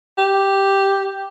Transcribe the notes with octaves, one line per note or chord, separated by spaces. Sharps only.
G4